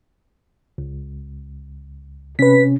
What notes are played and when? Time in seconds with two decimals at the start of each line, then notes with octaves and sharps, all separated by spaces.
0.78 C#2
2.39 C3 C#4 B4 B6